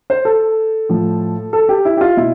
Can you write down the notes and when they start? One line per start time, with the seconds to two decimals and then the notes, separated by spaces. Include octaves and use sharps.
0.10 C5
0.25 A4
0.89 A2 F3
1.53 A4
1.69 G4
1.85 E4
1.97 G4
2.01 F4
2.17 B2 E4